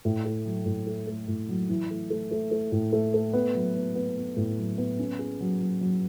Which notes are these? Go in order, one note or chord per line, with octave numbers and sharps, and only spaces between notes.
A2
A3
F#3
A2
A3
A3
A2
F#3
E3
A3
A3
A3
A3
A2
A3
A3
B3
F#3
B3
B3
B3
A2
F#3
B3
C#4
G#4
F#3
F#3
F#3